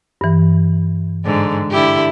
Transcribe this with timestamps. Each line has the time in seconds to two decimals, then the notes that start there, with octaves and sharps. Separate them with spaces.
0.21 G2 E3
1.25 G#2 D3
1.71 D3 E4 G4